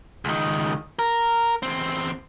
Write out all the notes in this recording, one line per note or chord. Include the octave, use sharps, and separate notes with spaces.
C#2 D#3
A#4
E2 C4